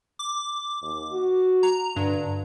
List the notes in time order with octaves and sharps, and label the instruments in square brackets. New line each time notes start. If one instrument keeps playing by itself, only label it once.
[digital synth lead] D6
[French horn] D#2
F#4
[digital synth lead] A#5
[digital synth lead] G2 [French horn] D3